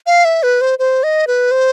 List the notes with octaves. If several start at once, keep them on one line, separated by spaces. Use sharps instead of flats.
F5
E5
B4
C5
C5
D#5
B4
C5